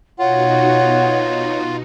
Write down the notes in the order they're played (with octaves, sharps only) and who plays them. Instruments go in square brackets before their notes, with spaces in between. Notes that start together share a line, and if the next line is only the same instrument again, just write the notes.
[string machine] B2 D#4 F#4 [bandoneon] F4 [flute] C#5 [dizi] F#5